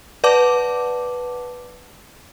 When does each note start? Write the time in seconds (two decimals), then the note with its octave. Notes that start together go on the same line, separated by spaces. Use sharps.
0.24 B4 D5 F#5 A5 D6